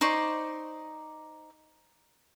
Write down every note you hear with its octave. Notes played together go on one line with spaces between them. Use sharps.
D#4 C5 D5 C#6